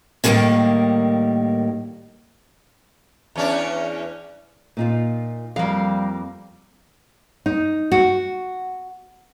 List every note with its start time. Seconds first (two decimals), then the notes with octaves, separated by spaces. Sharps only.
0.24 A2 D#3 F3 G3 G#3 A#3
3.36 E2 C#4 D4
4.77 A#2 D#4 F4
5.56 F2 G3 A#3 F5
7.46 D#4
7.92 F#4